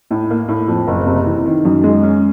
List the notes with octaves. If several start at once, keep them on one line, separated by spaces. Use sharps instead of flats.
A2
A#3
A2
F2
F#1
C3
E3
D#3
F#2
G#3
C#4